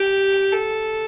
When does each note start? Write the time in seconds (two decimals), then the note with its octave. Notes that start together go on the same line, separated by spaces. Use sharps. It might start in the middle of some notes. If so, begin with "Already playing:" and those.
Already playing: G4
0.53 A4